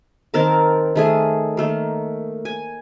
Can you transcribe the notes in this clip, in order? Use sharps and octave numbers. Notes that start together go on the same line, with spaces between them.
D#3 C4 A#4 A5
D#3 A3 G#4
D#3 A3 A#3
G#5